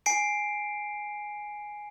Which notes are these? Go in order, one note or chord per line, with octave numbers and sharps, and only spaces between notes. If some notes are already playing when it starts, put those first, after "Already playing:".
G#5 C7 D7